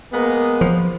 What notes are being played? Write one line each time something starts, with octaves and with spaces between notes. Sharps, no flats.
G#3 A#3 B3
F3